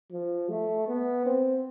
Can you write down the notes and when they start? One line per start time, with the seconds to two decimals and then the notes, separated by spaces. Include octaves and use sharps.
0.12 F3
0.49 A3
0.88 B3
1.26 C4